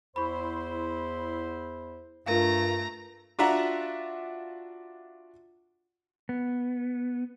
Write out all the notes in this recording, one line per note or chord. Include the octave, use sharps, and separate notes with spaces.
E2 E4 C5 B5 C#6
G2 A3 F4 A#4 F5 A#5
D4 F4 F#4 E5 F#5 A#5
B3